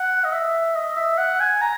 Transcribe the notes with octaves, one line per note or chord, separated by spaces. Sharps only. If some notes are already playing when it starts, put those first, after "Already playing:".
Already playing: F#5
D#5
E5
D#5
E5
F#5
G#5
A#5